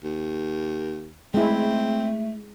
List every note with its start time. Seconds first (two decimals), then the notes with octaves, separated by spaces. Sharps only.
0.04 D#2
1.34 G#3 A3 C4 E4